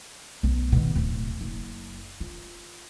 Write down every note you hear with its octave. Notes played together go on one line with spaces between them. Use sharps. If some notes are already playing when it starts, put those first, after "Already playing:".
B1
B2 D#3
D1
F#1
F4